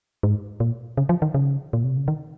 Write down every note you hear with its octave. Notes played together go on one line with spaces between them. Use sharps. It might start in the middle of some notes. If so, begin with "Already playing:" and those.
G#2
A#2
C#3
F3
D#3
C#3
A#2
C3
C#3
D#3